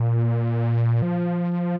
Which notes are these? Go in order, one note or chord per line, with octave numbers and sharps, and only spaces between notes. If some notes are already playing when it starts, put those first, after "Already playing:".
Already playing: A#2
F3